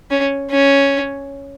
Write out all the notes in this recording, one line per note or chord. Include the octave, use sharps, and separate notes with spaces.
C#4
C#4